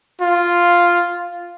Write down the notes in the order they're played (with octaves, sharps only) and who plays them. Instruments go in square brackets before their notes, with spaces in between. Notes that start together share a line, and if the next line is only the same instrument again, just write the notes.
[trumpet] F4